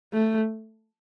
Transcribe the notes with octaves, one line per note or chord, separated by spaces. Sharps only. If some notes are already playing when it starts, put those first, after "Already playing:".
A3